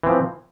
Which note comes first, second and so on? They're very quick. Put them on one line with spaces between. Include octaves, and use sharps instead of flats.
E3 C4 F3